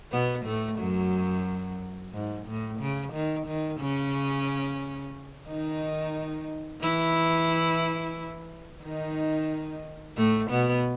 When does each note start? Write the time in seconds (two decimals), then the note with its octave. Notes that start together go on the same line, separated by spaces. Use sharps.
0.12 B2 B3
0.45 A2 A3
0.79 F#2 F#3
2.13 G#2
2.47 A2
2.80 C#3
3.13 D#3
3.47 D#3
3.80 C#3 C#4
5.48 D#3 D#4
6.82 E3 E4
8.83 D#3 D#4
10.17 A2 A3
10.50 B2 B3